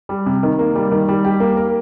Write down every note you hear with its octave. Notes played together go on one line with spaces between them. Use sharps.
G3
C3
D#3
A#3
G3
D#3
G3
G4
A#3
A#4